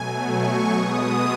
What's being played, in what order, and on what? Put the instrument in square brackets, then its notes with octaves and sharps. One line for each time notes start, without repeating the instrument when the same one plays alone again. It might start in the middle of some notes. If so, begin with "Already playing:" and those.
Already playing: [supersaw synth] B2 F#3 A3 G#5
C#6
B2 G#3 B3 D#6